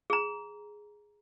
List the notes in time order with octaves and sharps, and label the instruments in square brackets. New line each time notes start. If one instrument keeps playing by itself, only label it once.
[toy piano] G#4 A#5